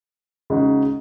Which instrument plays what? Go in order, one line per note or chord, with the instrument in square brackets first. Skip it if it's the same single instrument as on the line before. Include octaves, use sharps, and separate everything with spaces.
[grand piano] C#3 G#3 D#4 F#4